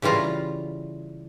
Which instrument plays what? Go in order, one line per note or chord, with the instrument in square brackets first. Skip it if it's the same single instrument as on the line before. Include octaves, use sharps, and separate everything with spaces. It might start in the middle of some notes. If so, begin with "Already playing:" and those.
[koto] C#3 E3 G3 F4 A#5